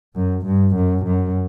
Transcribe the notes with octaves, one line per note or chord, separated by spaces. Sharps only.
F#2
G2
F#2
F#2